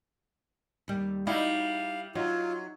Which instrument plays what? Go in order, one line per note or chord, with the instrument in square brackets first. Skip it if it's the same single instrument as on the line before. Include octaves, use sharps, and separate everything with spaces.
[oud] D#2 G3
[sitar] G3 E4 [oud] D#4 F#4 [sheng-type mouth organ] F5
[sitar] F#3 [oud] D#4 [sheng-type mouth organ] F4